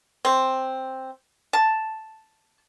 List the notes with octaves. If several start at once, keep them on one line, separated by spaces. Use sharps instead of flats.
C4
A5